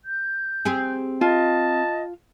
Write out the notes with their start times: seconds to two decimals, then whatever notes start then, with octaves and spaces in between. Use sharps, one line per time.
0.05 G6
0.65 C4 G4 G#4
1.21 F4 D#5 A5